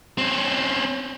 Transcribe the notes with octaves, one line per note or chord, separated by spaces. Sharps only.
C4 C#4